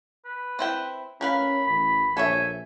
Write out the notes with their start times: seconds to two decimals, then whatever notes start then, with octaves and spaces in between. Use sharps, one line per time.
0.25 B4
0.59 C4 E4 G5
1.21 C#4 A#4 B4 F5 B5
1.67 A1 B5
2.17 A#1 A4 C#5 E5 G#5